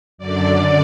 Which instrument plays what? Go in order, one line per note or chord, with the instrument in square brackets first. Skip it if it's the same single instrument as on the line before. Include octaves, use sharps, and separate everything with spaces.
[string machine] F#2 D3 D5